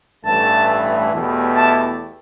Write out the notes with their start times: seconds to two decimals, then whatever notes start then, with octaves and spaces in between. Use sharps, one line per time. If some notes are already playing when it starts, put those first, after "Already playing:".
0.25 A1 G2 E3 A3 A5
1.12 E2 B2 A3 E4 G4
1.55 A5